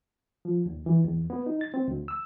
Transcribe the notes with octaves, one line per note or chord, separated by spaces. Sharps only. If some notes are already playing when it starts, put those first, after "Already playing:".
F3
D#2
E3
E2
B3
D#4
A6
C4
D2
E6